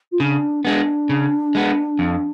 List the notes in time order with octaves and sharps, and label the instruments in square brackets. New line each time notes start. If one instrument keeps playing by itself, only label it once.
[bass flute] F4
[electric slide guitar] C#3 [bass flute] D4
[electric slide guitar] G#3 B3 [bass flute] D4
[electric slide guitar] C#3
G#3 B3
F2